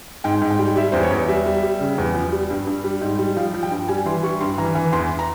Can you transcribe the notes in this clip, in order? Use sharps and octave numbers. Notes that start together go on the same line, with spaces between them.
G#2 G5
G#2
G5
G3
G3 E5
E2 C5
C#5
E2
G3 E5
G3
G3
C#3
E2
F3
G3
G2
G2
G3
G#2
G3
F3 F5
F3
G5
G2
G3 G#5
E3 C6
G3 C#6
G2 C6
E3 A#5
E3 G#5
E2 C6
A#5